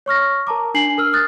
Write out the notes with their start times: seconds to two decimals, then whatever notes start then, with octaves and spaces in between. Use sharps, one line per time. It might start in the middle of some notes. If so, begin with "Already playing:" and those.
0.06 C#5 C#6 F6 A#6
0.47 A#4 A5 A#5 D6
0.74 D4 G#5 C7 F#7
0.98 A#4 E6 F6
1.13 D#6 F6 F#6 A6